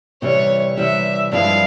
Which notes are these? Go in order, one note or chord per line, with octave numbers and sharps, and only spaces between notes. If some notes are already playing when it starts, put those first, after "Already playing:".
C3 E3 G3 C#5
C3 E3 G3 E5
G2 F3 G#3 C4 E4 F5